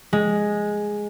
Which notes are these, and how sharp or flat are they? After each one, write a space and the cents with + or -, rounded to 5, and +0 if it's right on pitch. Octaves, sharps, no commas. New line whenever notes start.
G#3 +0